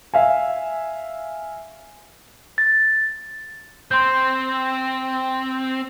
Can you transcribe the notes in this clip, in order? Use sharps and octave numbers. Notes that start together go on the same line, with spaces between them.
E5 F5 G#5
A6
C4 C6 G6